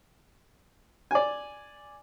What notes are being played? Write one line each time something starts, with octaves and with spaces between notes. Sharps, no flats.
D5 G#5